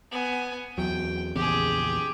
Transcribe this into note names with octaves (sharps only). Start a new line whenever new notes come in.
B3 G#5
E2 F#3 G5
A#1 E2 C#3 G4 G#4